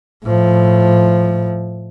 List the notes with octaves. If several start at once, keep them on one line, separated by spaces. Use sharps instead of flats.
A2 F3